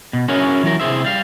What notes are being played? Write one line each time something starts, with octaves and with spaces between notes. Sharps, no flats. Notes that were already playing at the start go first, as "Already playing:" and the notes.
B2
C#4 E4 F#4 G#4 A#4 C#5
E3 F#3 A#4
C3 E4 G#4 C5 E5
G3 F5